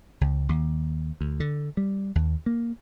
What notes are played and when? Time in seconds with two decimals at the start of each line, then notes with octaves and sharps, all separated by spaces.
0.21 C#2
0.49 D#2
1.21 D2
1.40 D3
1.77 G3
2.15 D#2
2.46 A#3